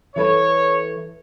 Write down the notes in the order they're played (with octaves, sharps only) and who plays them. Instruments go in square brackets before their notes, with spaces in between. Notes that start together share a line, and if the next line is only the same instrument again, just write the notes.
[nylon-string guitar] E3 A4 B4 [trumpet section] C#5